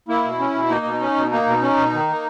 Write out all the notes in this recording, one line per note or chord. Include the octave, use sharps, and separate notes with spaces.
A#3 E4
B2
C#4
B2
A#3 D#4
B2
C#4
B2
A#3 D#4
B2
C#4
B2
D#3
A#3